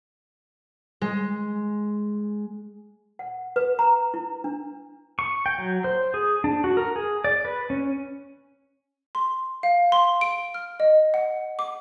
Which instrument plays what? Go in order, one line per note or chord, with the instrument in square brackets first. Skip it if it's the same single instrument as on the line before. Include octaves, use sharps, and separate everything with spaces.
[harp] G#3
[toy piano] F#5
B4
A#5
E4
D4
[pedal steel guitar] C#6
G5
F#3
C5
G#4
D4
F#4
A#4
G#4
D5
B4
C#4
[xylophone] C6
F5
C6
D7
F6
D#5
F#5
D6